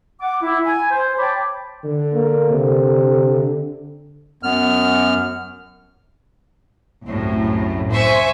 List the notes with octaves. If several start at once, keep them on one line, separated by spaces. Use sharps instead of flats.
F#5 D6
E4
G#5
C5
C#5 G5 A5 B5 D6
D3
A#3
C3
F#2 B3 F6
C2 F#2 A2
C5 E5 G#5 C#6